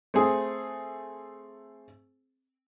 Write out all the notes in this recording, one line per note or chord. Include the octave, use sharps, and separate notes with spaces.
A3 C4 G#4